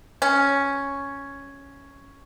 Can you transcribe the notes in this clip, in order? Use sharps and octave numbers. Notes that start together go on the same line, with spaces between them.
C#4